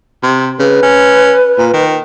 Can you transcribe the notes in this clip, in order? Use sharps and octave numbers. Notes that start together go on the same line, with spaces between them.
C3
C#3 B4
C#4
A#2
D#3